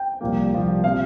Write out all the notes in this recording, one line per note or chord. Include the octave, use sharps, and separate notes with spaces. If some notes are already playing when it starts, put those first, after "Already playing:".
Already playing: G5
C2 A#2 F3 A#3
C2 A#2 F3 A#3
C3 F3 F5